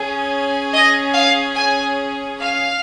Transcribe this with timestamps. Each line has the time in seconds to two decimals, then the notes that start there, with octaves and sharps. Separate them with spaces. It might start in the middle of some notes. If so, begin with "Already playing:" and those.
Already playing: C#4 G#4
0.73 D#5
1.14 F5
1.55 G#5
2.39 F5